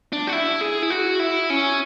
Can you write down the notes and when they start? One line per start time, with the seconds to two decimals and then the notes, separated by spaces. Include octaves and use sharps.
0.13 D4
0.27 F#4
0.33 E4
0.61 G#4
0.82 E4
0.90 F#4
1.19 E4
1.50 C#4